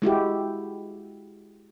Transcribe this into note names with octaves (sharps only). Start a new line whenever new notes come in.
G#3 E4 F#4 G4